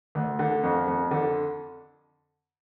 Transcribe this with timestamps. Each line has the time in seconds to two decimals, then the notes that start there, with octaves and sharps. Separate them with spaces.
0.15 D2
0.39 D3
0.63 F2
0.87 F2
1.11 D3